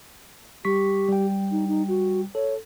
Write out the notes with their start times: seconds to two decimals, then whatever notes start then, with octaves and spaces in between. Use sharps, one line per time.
0.65 G3 G4 C#6 B6
1.08 G3 G5
1.51 D#4
1.67 D#4
1.88 F#4
2.35 A4 C#5